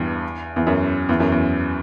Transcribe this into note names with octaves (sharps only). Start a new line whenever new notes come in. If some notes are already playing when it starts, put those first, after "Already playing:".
Already playing: E2 G2
E2
F#2
E2
F#2
E2